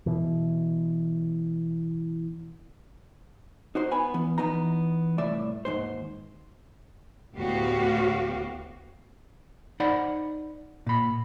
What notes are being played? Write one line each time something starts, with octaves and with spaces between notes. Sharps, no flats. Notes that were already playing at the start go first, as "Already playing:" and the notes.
B2 E3
D#4 F#4 C5
B3 G#5 B5
E3 B3
E3 B3 D#4 A#5
C2 A2 D5 E5
D#2 G#2 C5
D2 A2 B3 F#4 G4 F5
D#4 C5 D5 F#5 B5
A#2 B5